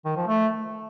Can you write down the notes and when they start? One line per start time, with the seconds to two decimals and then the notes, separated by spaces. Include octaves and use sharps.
0.05 D#3
0.16 F3
0.28 A3